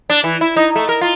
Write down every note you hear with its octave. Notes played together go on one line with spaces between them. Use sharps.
D4
E3
E4
D#4
A3
A#4
F4